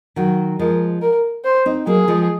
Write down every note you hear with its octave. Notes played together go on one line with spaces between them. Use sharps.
D#3 F#3 F#4
F3 G#3 A#4
A#4
C5
C4 D#4
F#3 A#3 G#4
F3 G#3